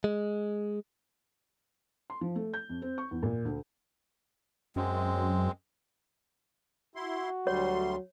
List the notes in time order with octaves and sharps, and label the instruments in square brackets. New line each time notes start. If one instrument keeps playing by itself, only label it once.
[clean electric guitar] G#3
[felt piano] C6
F3
A3
G6
F2
C4
C#6
E2
A#2
D2
[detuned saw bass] F#2 [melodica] G#3 C4
[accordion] E4 C6 [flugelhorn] F#4
[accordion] D2 G3 C6 [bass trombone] F#3 [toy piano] C#5